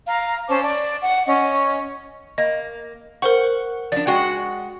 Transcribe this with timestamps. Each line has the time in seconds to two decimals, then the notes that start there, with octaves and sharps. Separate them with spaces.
0.08 F5 A#5
0.49 C#4 C5 A5 D6
0.63 D5
1.01 F#5
1.27 C#4 D#5
2.38 A#3 D#5
3.22 A#4 C5 F#5 C#6
3.92 F3 D4 D5
4.07 G#3 F#4 F#5 G5